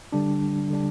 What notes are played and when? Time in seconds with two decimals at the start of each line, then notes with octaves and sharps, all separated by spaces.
0.12 D3 G3 D4
0.70 D3 G3 D4